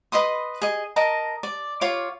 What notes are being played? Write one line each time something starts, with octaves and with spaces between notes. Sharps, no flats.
B4 D#5 C6 D#6
G#4 D#5
A#4 D#5 A5 A#5
D5
F4 C#5 F5 D6